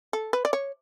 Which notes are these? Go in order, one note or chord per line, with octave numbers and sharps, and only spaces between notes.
A4
B4
D5
C#5